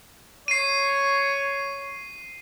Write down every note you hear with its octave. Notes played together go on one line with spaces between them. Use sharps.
C#5 C7 D#7